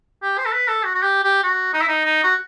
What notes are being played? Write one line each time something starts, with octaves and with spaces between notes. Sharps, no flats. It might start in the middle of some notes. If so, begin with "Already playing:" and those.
G4
C5
A4
B4
A4
F#4
F#4
G4
G4
F#4
D#4
E4
D#4
D#4
F#4